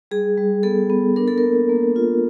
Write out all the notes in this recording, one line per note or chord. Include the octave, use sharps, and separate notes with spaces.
G3 G#4
G3
B3 A4
B3
D4 A#4
A4
A#4
A#3
A#3
F4